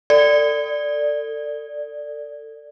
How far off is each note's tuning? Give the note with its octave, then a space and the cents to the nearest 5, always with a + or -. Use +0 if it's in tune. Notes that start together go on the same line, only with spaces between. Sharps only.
A4 +30 D5 +0